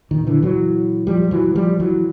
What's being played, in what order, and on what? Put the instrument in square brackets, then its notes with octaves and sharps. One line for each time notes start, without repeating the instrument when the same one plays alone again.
[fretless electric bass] A#2 D#3
D3 E3
E3 F#3
F3 G3
E3 F#3
F3 G3
E3 F#3